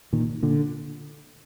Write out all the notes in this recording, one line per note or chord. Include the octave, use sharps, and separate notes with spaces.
A#2 D#3
A#2 D3